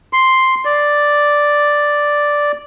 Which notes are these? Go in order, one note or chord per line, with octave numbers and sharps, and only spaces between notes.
C6
D5